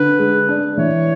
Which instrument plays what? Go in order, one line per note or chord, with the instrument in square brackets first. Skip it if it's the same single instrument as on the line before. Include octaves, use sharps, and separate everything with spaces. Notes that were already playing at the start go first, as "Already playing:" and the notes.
Already playing: [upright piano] D3 [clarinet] B4
[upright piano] G#3
D4
[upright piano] E3 [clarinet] C#5